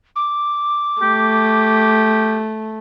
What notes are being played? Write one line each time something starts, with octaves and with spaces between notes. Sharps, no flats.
D6
A3 G4